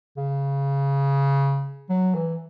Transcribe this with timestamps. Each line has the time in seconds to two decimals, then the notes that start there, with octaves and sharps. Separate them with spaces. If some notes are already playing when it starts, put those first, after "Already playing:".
0.17 C#3
1.89 F#3
2.14 E3